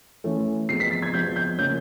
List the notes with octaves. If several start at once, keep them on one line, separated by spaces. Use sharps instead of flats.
E3 A3 C#4
C3 F3 G#3 B3 C7
B6
A6
G#6
C3 F3 G#3 B3 G6
G6
C#3 F3 A#3 C#4 G6